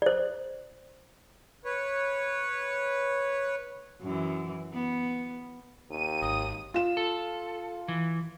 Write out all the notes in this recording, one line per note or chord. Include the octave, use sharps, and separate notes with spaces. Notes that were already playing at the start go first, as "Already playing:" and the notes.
C5 D5
B4 C#5
F#2 E3
B3
D#2 D#7
G#1 D#6
F4 E7
A4
E3